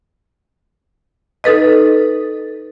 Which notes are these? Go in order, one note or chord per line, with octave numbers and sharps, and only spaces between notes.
D#4 A4 B4 D#5